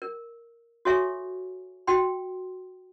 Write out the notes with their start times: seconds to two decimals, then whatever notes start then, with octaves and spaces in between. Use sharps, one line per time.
0.02 A#4
0.85 F#4 A4 C#5 E5 G#5 C#6
1.87 F#4 G5 C6